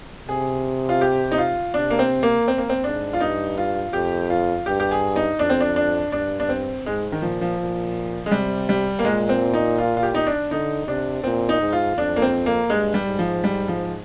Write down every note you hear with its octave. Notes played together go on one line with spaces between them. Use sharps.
C3 G#4
F4
G4
D#4
F4
C3 D4
A#3
C4
A#3
C4
A#3
C4
G#2 D4
F4
G2 D#4
F4
F2 G4
F4
G2 G4
G4
G#4
D#4
F2 D4
C4
D4
D4
G2 D4
D4
C4
G#2 G#3
D#3
A#2 F3
F3
A#2
G#3
C3 G3
G3
A#3
A#2 G#3
C4
D#4
F4
F4
G4
D#4
D4
D3 D#4
C3 D4
A#2 C4
D#4
G#2
F4
F2 D4
A#3
C4
A#3
G2 G#3
G3
G#2
F3
G3
F3